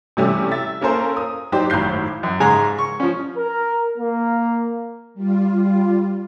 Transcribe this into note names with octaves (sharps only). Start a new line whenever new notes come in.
C3 E3 G3 A3 C#4
E5 A6
A#3 C#4 A4 A#4 C5
D#6
F#3 D#4 G4 C5 D5
G#1 F#2 A2 G6 C7
F#2
G#2 C#3 G#3 G#5 A#5
C#6
F3 C#4
A#4
A#3
G3 F4